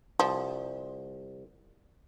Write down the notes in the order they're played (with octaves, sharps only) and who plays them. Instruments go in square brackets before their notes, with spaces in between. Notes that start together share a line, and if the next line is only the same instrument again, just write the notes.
[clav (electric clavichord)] C2 [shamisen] F3